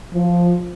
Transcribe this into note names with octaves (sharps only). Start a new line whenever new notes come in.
F3